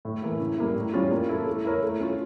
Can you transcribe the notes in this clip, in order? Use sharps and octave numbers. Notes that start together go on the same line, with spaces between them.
A2
E3 A#3 E4 A4
C#3
G3 A#3 E4
A2
G3 C#4 F4
A#3
E4 A4
A3
E4 A#4 C#5
A3
C#4 F4